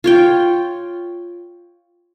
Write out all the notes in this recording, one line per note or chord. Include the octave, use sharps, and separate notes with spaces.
F4 C#5 G5